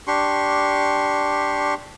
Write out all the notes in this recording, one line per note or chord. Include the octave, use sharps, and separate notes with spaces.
D4 G4 C6 C#6